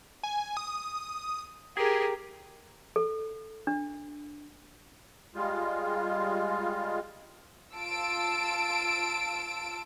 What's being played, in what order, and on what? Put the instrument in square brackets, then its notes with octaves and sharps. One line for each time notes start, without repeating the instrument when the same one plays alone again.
[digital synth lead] G#5
D#6
[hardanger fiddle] G4 A#4 [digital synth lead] G#4
[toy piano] A4
D4
[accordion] G3 G#3 F4
[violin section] F4 A5 E6 D7